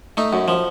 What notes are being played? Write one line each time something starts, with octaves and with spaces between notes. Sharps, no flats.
A3 D#4
F#2
F3